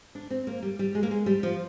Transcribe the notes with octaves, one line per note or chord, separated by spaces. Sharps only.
D4
C4
A#3
G3
G3
G#3
A#3
G#3
G3
F3